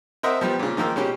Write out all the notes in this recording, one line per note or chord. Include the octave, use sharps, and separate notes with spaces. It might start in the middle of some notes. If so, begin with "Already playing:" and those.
C4 A#4 C5 D#5 E5 F#5
F3 G3 B3
A#2 C#3
D#3 F3 A#3 E6
B2 G#3 C#4 G4